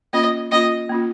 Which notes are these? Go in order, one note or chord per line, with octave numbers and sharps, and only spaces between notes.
A#3 C#4 F4 D#5
A#3 C#4 F4 D#5
A#3 C#4 F4